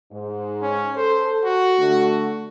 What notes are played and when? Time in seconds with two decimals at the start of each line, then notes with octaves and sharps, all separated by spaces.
0.12 G#2
0.62 C#4
0.96 A4 C5
1.45 F#4
1.78 D3 A3